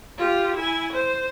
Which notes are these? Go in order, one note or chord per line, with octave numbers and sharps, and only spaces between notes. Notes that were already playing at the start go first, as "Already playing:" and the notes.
F4 G4
E4 G#5
C5